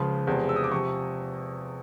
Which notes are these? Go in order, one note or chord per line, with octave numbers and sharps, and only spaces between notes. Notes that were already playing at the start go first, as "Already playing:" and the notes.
Already playing: C#2 C#3 F3 C6
E2 C3 F3 G#3
E6
D#6
D6
C3 F3 C#6